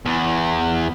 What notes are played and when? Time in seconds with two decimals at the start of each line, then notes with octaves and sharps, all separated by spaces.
0.06 E2